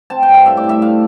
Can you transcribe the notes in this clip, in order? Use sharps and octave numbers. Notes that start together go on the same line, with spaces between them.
C4 A5
G5
G2
F5
A2 E5
D5
A2
E5
A3 F5